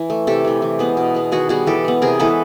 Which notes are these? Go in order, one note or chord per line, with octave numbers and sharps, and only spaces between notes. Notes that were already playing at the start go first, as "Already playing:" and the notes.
Already playing: E3
A3
C3 G4 A4
E3 A3
E3
G#3 B3
B2
G#3 B3
D#3 F#4 G#4
G3 B3 F#4 G#4
E3 G4 A4
G#3 B3
C3 G#4 A#4
E3 G#3 B3 A4 B4